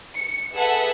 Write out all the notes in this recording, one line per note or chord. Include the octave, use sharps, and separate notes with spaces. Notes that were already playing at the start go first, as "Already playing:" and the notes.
C#7
G#4 A4 B4 E5 F#5